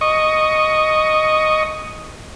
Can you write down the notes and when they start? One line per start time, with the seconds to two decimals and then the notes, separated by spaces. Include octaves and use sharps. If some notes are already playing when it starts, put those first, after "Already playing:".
0.01 D#5 C#6